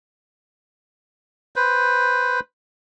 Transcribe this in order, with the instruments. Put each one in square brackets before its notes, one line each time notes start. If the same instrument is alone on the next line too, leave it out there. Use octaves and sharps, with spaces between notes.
[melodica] B4 C5